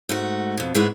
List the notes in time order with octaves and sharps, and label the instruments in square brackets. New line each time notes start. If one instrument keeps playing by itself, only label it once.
[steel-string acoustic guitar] G#2 A3 F#4
F2 B2
G#2 E3 G#3 A3 B3